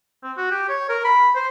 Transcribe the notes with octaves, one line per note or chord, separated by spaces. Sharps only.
C4
F#4
G4
C#5
A#4
B5
C5